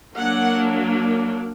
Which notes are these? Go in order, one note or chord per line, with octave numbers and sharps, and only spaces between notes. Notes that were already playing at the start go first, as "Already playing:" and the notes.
F#3 A#3 D4 F#5